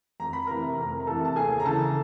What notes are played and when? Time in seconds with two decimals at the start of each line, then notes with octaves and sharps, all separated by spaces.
0.20 F2 A#5
0.33 B5
0.47 C3 E3 A3 A#4 A#5
0.78 F2 A#4 A#5
1.00 A#5
1.07 C3 E3 A3 A4 A5
1.25 A5
1.36 D#2 G#4 G#5
1.60 A#5
1.65 C#3 E3 A4 A5